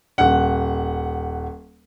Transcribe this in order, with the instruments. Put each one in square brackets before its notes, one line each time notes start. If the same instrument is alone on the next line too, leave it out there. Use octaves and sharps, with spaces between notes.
[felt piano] D#1 F#5